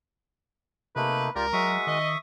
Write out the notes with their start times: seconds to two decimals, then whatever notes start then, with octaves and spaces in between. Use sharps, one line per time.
0.96 C3 A3 A#3 D#4 B4
1.36 C#2 F4 G4 A#4 D5
1.53 F#3 G#3 F#4 E5 C#6 D#6
1.87 D#3 D#5